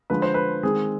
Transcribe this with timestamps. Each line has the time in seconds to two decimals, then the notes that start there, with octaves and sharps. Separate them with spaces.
0.10 D3 F3 G#3 B4
0.22 C5
0.34 B4
0.63 D#3 G#3 C4 G#4